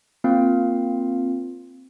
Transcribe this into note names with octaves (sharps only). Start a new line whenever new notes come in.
A#3 C4 F4 F5